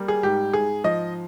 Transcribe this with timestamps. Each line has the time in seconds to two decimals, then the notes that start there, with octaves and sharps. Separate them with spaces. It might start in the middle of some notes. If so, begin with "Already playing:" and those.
Already playing: G3 A#3
0.08 G#4
0.23 G#2 G4
0.53 G#2 G#4
0.84 F3 D#5